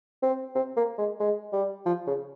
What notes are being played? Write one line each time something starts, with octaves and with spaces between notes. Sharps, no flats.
C4
C4
A#3
G#3
G#3
G3
F3
C#3